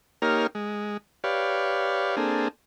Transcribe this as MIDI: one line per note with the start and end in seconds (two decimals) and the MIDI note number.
0.22 0.47 58
0.22 0.47 63
0.22 0.47 67
0.22 0.47 70
0.22 0.47 73
0.22 0.47 89
0.55 0.97 56
1.24 2.16 67
1.24 2.16 71
1.24 2.16 73
1.24 2.16 74
1.24 2.16 77
2.17 2.48 58
2.17 2.48 60
2.17 2.48 62
2.17 2.48 68
2.17 2.48 69